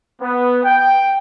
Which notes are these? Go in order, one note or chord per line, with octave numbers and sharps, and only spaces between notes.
B3
G5